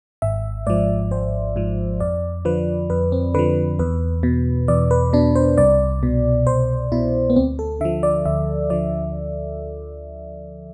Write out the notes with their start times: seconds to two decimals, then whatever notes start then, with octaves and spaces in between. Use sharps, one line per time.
0.22 G#1 E5
0.67 G#2 F3 D5
1.11 G#1 C5
1.56 G#2 F3
2.00 F2 D5
2.45 D3 F3 B4
2.90 F2 B4
3.12 C4
3.35 D3 F3 B4
3.79 E2 B4
4.23 B2
4.68 E2 D5
4.91 B4
5.13 B2 D4
5.35 C5
5.58 C2 D5
6.03 B2
6.47 C2 C5
6.92 B2 E4
7.30 B3
7.36 D2 C4
7.59 A4
7.81 D3 E5
7.85 F3
8.03 D5
8.25 D2 E5
8.70 D3 F3 D5